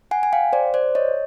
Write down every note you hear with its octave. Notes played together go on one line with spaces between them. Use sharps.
F#5 G#5
G#5
F5 G5
C5 D5
C5 D5
C#5 D#5